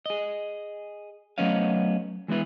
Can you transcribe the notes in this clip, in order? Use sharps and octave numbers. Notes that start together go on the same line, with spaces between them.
G#4 D#5
F#3 A3 B3 C#4 D#5 F5
E3 G#3 B3 E4 B4